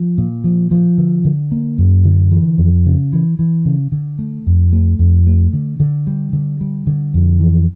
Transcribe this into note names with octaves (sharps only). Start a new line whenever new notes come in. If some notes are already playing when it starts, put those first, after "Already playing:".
Already playing: F3
A#2
F3
F3
D3
D3
A#3
F#2
D3
E3
F2
C#3
E3
E3
C#3
D3
A3
F2
A3
F2
A3
D3
D3
G3
D3
G3
D3
F2
E3